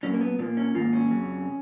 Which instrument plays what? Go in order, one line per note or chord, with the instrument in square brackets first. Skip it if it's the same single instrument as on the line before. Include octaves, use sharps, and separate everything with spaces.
[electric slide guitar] A#2 F#3 A#3 C#4
A#3
B3
A#2 F3 A#3 B3
C#4
G#2 D#3 A#3 F4
C#4
F2 C#3 F#3